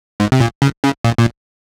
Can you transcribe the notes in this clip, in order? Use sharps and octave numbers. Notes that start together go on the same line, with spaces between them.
G#2
C3
A#2
C#3
C#3
A#2
A#2